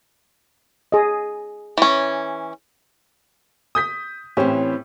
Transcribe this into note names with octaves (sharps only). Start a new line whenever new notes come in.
G#4 D#5
E3 C#4
D#6 G6 B6
A2 E3 C4 C#4 G4